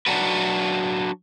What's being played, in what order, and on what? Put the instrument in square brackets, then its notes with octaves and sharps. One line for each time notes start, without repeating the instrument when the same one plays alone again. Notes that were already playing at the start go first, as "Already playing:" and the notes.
[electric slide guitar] F#3 D4 F#4 B4